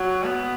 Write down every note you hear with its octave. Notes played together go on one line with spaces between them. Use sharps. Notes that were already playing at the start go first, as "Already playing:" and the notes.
Already playing: F#3
B3